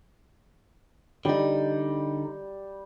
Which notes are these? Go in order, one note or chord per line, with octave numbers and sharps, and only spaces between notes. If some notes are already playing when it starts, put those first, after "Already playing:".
D3 G3 D#4